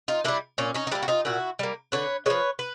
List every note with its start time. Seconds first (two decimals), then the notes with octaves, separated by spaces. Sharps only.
0.08 D#4 F4
0.24 G3 A#3 D4 E4
0.58 A#2 C#4
0.74 C#4 D#4
0.87 D#4
0.91 G3 A#3 D4 E4
1.03 F#4
1.08 D#4 F4
1.25 A#2 E4 F#4
1.59 G3 A#3
1.92 D3 B4 C#5
2.26 F3 G#3 B4 C#5
2.59 B4